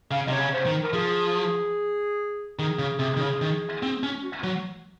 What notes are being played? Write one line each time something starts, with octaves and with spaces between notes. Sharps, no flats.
C#3 F5
D#5
C3 C#5
C#3
C5
D#3
A#4
F3 G#4
D#3 G#4
C#3
C3 G#4
D#3
C#3
D#3
C4
C#4
F#4
F#3